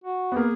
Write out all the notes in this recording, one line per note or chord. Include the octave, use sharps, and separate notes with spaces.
F#4
B3
A#3 G#4